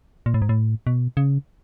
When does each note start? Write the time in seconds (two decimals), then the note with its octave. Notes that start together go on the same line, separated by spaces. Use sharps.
0.26 A#2
0.34 A2
0.42 G#2
0.49 A2
0.87 B2
1.17 C#3